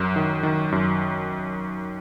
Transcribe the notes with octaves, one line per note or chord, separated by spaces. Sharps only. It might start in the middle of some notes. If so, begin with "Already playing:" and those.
Already playing: F#2 A#4
D#3
D#3
F#2